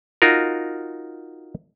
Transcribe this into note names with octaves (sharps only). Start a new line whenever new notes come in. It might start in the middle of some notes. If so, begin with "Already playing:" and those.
D#4 F4 F#4 A#4